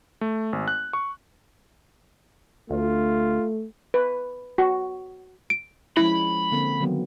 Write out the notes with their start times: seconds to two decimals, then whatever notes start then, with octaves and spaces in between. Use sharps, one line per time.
0.21 A3
0.53 G#1
0.68 F#6
0.93 C#6
2.70 D2 A3 F4
3.94 B4
4.58 F#4
5.50 D7
5.97 F3 G#3 C#4 E4 B5
6.52 D3 A#3 C4
6.80 D#3 F#3 B3